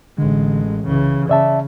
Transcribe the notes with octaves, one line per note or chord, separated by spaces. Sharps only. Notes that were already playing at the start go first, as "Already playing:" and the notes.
A1 D3 G#3
C2 C#3 E3
C#3 D5 E5 A5